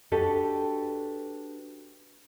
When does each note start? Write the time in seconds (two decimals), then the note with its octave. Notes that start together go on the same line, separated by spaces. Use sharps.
0.12 D4 F#4 G4 A4 B4 D#5